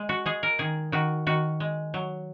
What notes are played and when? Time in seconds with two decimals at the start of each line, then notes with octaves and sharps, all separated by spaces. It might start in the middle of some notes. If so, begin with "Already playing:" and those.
Already playing: G#3
0.09 F#4
0.26 G#3 G#4
0.43 A#4
0.59 D#3 G#4
0.92 D#3 F#4
1.26 D#3 F#4
1.60 G#3
1.94 F#3